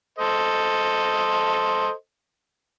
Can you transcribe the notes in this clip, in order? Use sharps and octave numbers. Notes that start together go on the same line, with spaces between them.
A4 C5 D#5